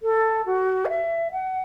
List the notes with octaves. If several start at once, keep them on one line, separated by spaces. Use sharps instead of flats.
A4
F#4
F#5
E5
F#5